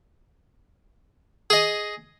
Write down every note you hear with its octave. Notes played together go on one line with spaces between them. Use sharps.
G#4 D#5